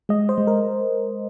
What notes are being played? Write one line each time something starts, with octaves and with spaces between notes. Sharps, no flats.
G#3 D#5
C5
G#3
A#4